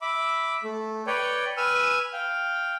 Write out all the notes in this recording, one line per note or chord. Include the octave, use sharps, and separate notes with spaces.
E5 B5 D6
A3
B4 C#5 D5 G5
B4 G#5 E6 F6
F5 G5